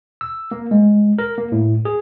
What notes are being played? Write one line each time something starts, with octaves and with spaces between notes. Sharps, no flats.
E6
A#3
G#3
A#4
A#3
A2
G#4